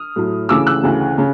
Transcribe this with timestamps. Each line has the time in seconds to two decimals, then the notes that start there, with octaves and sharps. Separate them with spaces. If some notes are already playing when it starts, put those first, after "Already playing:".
Already playing: D#6 F6
0.16 A2 F#3 A3
0.49 D2 C#3 E3 A3 D6 E6
0.67 E6 F#6
0.83 D2 C#3 E3 A3
1.18 C#3